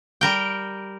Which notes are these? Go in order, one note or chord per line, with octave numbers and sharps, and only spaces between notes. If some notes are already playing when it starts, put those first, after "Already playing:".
G3 A#4 G5